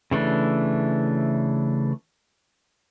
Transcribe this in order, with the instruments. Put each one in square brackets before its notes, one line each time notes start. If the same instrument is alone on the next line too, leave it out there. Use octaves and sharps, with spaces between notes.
[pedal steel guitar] C#3 E3 A3 D4